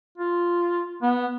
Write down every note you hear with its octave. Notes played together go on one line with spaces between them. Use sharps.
F4
B3